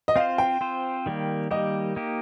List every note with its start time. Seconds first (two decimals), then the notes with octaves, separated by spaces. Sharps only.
0.08 D#5
0.16 C4 F4 C5 F5
0.38 G5
0.61 C4 F4 C5
1.06 D#3 G3 A#3 G4
1.51 D#3 G3 A#3 G4 D#5
1.96 A#3 D#4 G4